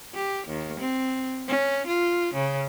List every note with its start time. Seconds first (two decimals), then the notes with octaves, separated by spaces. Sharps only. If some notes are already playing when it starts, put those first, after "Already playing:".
0.14 G4
0.47 D#2
0.80 C4
1.48 C#4
1.87 F4
2.34 C#3